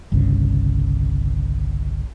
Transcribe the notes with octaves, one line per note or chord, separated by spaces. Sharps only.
G1 C2 G2 C#3